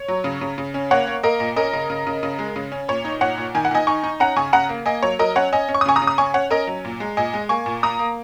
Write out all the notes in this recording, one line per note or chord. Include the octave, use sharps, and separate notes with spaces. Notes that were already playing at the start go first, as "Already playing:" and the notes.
Already playing: C#5
F#3
C#3
C#3
C#3
C#4
A#3 C#5 F#5
A#3
A#3 A#4 D#5
A#2
C#4 A#4 D#5
C#3
C#3
C#3
C#3
G#3
C#3
C#4
A#2 C#5
D#4
A#2 C#5 F#5
A#2
D#3 G#5
F#5
D#3 D#5 G#5
D#4 G#5 C#6
D#4
C#4 F#5 A#5
C#3 G#5 C#6
C#3 F#5 A#5
A#3
A#3 D#5 G#5
F#3 C#5
F#3 A#4 D#5
C#4 C#5 F#5
C#4 D#5 G#5
C#4
C#6
D#6
C#3 G#5 C#6
A#5 D#6
C#3
D#6
C#4 G#5 C#6
C#4 C#5 F#5
C#4 A#4 D#5
F#3
A#2
G#3
A#2 D#5 G#5
G#3
A#3 G#5 C#6
A#2
A#3 A#5 D#6
A#3